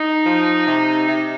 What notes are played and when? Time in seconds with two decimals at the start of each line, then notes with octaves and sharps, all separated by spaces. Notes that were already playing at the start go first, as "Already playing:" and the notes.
Already playing: D#4
0.25 F3
0.66 C3
1.08 C3